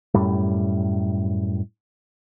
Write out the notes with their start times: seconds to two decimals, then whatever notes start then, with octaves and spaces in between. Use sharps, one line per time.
0.14 F#2 A2 G3